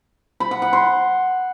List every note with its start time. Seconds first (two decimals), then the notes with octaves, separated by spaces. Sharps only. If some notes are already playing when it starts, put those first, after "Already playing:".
0.40 B5
0.51 F#5
0.62 F#5
0.73 C6